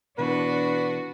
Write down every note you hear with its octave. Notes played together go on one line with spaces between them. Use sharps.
B2 E3 D4 F#4 B4